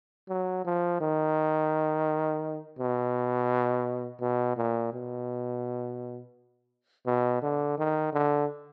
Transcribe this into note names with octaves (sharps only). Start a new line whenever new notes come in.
F#3
F3
D#3
B2
B2
A#2
B2
B2
D3
D#3
D3